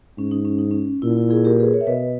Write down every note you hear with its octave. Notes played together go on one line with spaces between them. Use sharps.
G#2 C#4
D#4
C#4
D#4
C#4
A#2 E4
E4
E4 G#4
G4 A#4
G#4 B4
A#4 C#5
E5
B2 B4 D#5